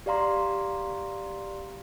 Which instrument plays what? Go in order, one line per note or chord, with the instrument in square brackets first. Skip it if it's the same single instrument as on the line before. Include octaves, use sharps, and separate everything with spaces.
[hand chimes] G4 D5 F5 A#5 C6